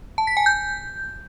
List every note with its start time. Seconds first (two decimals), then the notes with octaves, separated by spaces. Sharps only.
0.18 A5
0.27 B6
0.37 G#5
0.46 G6